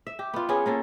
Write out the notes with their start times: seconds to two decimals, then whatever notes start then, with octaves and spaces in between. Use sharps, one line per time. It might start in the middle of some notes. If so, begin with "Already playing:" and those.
0.07 E5
0.19 G4
0.34 B3 F4
0.49 B3 C#4 G#4
0.66 A#3 C#4 A4